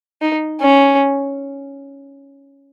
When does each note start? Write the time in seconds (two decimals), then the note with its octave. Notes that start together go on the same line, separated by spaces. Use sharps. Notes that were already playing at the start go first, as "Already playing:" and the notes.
0.22 D#4
0.61 C#4